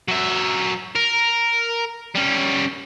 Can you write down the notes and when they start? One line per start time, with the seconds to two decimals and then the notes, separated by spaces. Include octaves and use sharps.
0.08 F#3 E5
0.95 A#4
2.15 G3 C#4